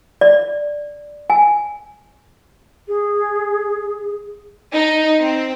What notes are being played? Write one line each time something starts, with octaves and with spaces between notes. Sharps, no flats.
D5
G#5
G#4
D#4
C4